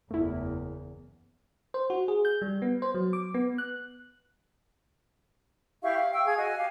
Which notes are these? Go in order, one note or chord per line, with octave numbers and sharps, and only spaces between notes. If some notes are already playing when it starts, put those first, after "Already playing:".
F#1 E2 A3 E4
C5
F#4
G#4
G6
G3
B3
C5
F#3
D6
B3
F#6
E4 G4 F5 C#6
E5 F5
G5 C#6 E6
G#4 F5 G#6
F#4 D#5 G#5
G4 F5